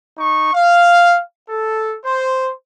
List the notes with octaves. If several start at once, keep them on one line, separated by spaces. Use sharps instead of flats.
D#4 C#6
F5
A4
C5